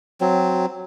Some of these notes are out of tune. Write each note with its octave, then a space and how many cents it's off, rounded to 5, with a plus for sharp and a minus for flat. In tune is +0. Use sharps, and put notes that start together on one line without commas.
F#3 +0 C4 +0